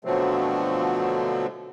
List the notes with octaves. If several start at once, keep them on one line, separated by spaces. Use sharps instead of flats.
B2 D3 F3 F#3 A3 C4